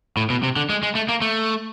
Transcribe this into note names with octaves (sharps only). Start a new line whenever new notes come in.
A2
B2
C3
D3
G#3
G#3
A3
A#3
A3